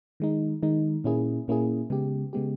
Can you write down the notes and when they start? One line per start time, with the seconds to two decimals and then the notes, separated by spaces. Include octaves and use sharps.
0.20 D#3 G#3 D#4
0.63 D#3 G#3 D#4
1.04 A#2 A#3 C#4 E4 G#4
1.48 A#2 A#3 C#4 E4 G#4
1.90 C#3 G#3 B3 G4
2.33 C#3 G#3 B3 G4